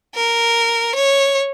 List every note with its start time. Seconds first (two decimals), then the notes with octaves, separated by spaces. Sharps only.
0.15 A#4
0.95 C#5